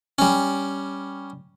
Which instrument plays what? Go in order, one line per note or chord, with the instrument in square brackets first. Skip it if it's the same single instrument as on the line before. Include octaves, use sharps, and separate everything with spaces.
[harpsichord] G3 C#4